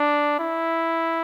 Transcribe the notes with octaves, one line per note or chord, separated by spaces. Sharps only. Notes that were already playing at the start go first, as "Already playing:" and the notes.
Already playing: D4
E4